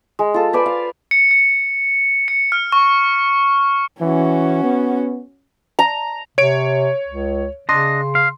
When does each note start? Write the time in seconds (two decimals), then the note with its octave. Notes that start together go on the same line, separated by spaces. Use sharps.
0.19 G#3
0.34 F4 A4
0.53 B4 C5 D5 G#5
0.66 F5
1.11 C#7
1.31 C#7
2.28 C#7
2.52 F6
2.72 C#6
4.01 E3 C#4 F#4
4.63 B3
5.79 A#5
6.38 C3 C#5 D7
7.07 C#2
7.69 C#3 D4 D#5 C6
8.15 F5